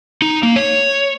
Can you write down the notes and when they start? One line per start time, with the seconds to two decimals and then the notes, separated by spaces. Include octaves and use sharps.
0.22 D#4
0.43 A#3
0.56 C#5